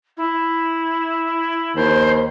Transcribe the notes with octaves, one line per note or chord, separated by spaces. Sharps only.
E4
D#2 C5